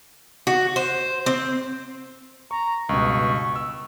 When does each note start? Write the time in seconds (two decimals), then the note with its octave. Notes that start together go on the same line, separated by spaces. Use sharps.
0.47 F#4
0.76 C5
1.26 C4
2.51 A#5 C#6
2.89 C#2 G2 B2 C#6
3.56 E6